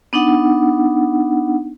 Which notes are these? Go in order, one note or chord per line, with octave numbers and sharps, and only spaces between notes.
B3 D4 D#4 F#5